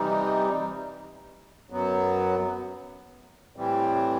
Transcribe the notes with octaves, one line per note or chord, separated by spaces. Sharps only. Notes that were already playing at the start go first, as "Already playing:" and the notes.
Already playing: C3 E3 G3 D#4
F#2 F#3 B3
A2 E3 G3 C4